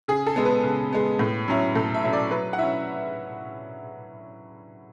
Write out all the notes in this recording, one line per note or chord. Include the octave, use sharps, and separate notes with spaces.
C#3 G#4
A4
G#3 B3
B4
C#3
G#3 B3
A2
F#3 C#4 E4
A2 A4
E5
F#3 C#4 E4
D5
F#3 B4
F#5
C#4 E4 E5